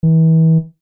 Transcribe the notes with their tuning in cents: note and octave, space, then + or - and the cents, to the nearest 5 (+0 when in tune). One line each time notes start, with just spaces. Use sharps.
E3 -35